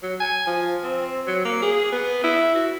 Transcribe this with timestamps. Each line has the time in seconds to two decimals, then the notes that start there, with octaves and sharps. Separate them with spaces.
0.03 F#3
0.20 G#5
0.47 F3
0.83 C4
1.27 F#3
1.45 A#3
1.62 G#4
1.93 B3
2.24 E4
2.55 F#4